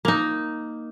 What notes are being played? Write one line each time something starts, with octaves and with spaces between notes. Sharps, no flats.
A#3 D#4